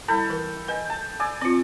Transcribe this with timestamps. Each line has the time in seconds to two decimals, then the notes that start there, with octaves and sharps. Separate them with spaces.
0.08 G3 E4 A4 G5 A#5 B5
0.30 E3 A#4 B4
0.68 B4 D#5 G5 G#5
0.90 A5
1.20 D5 G#5 E6
1.42 C4 F4 D5